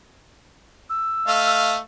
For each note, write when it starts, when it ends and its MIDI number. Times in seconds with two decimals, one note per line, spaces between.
0.90 1.55 88
1.27 1.77 57
1.27 1.77 75
1.27 1.77 77